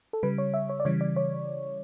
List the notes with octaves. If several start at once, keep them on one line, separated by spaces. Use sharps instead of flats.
A4
C#3 G3 B4
C#5
E5
C#5
D5
C#3 E3 G3 C#5
D5
C#5